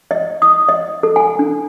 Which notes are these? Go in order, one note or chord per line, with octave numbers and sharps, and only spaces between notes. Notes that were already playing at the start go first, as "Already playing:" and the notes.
D#5
D#6
D#5
A4
G#5
D4